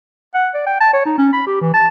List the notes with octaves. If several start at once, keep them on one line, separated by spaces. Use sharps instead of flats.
F#5
D5
G5
A5
C#5
D#4
C#4
B5
G4
E3
A5